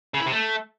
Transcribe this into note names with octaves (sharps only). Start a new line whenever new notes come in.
C#3
E4
C3
A3